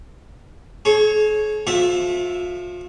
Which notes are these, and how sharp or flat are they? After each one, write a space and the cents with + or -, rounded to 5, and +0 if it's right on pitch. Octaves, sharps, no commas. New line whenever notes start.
G#4 +45 C#5 -5
F3 -5 F4 +40 E5 +0